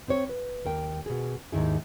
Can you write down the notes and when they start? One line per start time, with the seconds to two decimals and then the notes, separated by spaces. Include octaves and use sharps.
0.08 C4 C5 C#5
0.29 B4
0.65 D#2 A#4 G5
1.06 B2 G#4
1.52 D#2 G#2 D#3 E4 G#4